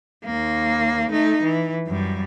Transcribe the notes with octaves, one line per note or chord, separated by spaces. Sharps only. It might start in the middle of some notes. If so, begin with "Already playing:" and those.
D#2 A#3
A3 D#4
E3
F#2 G3